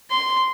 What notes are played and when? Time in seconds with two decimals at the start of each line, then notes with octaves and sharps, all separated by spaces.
0.11 C6